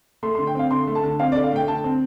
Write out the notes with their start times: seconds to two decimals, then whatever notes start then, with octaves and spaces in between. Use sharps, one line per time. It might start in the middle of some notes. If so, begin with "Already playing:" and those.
0.23 A3 C6
0.35 C6
0.38 D3
0.47 G5
0.55 C4 F5
0.71 D3 C6
0.87 A3
0.95 A5
1.03 D3
1.20 C4 F5
1.32 D5
1.36 D3
1.44 F5
1.52 A3 G5
1.68 D3 A5
1.84 C4